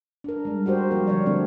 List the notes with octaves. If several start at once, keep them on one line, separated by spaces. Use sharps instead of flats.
D4 A#4
G3 G#3
F#4 G4 A#4 C5
F3 G3 A#3 A#4
D3 C#5 D5
D3 A3 C4 D4